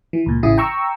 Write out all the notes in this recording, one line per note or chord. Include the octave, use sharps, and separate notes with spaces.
E3
C#2 A#2
A1 C#3 E4 D#6
G5 A#5 C#6 E6